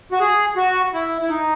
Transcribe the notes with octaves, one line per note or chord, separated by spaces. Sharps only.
F#4
G#4
F#4
E4
E4
D#4